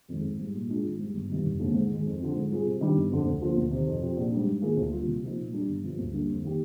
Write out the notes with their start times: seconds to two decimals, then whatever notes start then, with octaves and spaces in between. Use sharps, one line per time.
0.08 F2 D#3 G#3
0.23 G#1
0.39 G#2 G3
0.54 A#2
0.69 G#3 D4 F4
0.84 G#1
0.99 G#2 G3
1.14 G1
1.30 G2 D#3 G3
1.45 F1
1.59 D#2 D3 G#3 C4
1.74 G#2
1.90 D#3 G#3
2.06 F2
2.20 D3 F3 C4
2.35 G#2
2.50 G3 C4 F4 G#4
2.66 C3
2.81 D#3 G3 D4
2.95 G1
3.11 F2 D3
3.25 D2
3.42 D3 F3 A#3 F4
3.57 D2
3.71 C3 D#3
3.87 F2
4.02 C3 F3 C4
4.17 A#1
4.32 G#2 G3 D4
4.47 G#2
4.62 D#3 A#3 F4 G#4
4.77 D2
4.92 D3 G3 A#3 F4
5.07 C2
5.23 C3 F3 A#3 D#4
5.37 A#2
5.53 G3 D4
5.68 G1
5.83 G2 F3
5.98 D2
6.13 D3 G3 A#3 D4
6.29 F2
6.43 D#3 A#3 D#4 G4